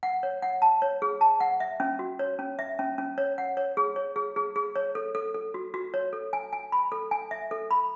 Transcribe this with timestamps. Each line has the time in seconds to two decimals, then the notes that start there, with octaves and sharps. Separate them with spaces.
0.03 F#5
0.23 C#5
0.42 F#5
0.62 A5
0.82 C#5
1.02 G#4
1.21 A5
1.40 F#5
1.60 E5
1.80 C#4
1.99 F#4
2.19 C#5
2.39 C#4
2.59 E5
2.79 C#4
2.98 C#4
3.18 C#5
3.38 F#5
3.57 C#5
3.77 G#4
3.96 C#5
4.16 G#4
4.36 G#4
4.56 G#4
4.76 C#5
4.95 A4
5.15 A4
5.34 A4
5.54 F#4
5.74 F#4
5.94 C#5
6.13 A4
6.33 G#5
6.53 G#5
6.72 B5
6.92 A4
7.11 G#5
7.31 E5
7.51 A4
7.71 B5